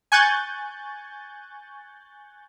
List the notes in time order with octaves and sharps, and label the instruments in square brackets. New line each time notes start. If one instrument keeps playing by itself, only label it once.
[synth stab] G#5 C#6 F#6 G6 A6